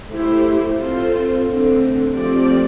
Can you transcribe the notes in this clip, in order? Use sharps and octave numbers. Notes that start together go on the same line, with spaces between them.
A3 E4 G4 C5
C4 F4 A4 C5
D3 A3 C4
F3 A3 C4 G4 D5